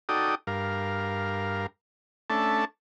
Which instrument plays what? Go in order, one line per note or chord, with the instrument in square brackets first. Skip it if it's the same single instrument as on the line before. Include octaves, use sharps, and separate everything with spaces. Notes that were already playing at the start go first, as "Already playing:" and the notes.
[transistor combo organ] D#4 F#4 A4 D5 G5 D#6
G2 A#4 F5
A3 C#4 D4 A4 E5 A5